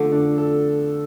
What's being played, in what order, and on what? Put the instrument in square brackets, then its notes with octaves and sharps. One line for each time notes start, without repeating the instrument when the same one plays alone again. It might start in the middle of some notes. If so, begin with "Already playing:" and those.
Already playing: [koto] D3 [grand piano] F3 A3 A4
[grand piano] D4
A4